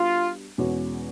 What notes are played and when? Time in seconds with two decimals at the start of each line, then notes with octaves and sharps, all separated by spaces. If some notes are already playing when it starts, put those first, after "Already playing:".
Already playing: G3 B3 D4 F4 F#4
0.58 E2 B2 G#3 C#4 F#4